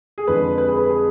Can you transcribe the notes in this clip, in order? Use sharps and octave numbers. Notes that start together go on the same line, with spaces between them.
G#4
F2 D3 G#3 B4
B4
G#4
B4
G#4